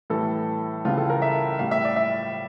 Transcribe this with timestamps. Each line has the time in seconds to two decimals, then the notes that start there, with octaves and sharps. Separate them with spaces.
0.10 A2 E3 G3 A4
0.85 C#2 C#3 E3 G3 F4
0.98 A4
1.10 A#4
1.22 E5
1.59 A2 G3 F5
1.71 E5
1.85 D5
1.96 E5